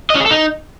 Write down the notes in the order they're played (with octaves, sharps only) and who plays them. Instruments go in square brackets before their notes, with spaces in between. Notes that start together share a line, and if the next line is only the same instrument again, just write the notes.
[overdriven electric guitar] D#5
C#4
G#4
A4
D#4